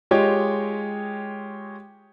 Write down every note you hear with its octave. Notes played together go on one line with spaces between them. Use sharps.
G#3 F4 G4 C#5 D#5 G5